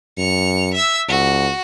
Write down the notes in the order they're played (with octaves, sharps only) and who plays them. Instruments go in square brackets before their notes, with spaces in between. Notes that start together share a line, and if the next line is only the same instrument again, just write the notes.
[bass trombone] F#2 [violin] C#7 F7
[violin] E5 E6
[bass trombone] C#2 [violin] F#4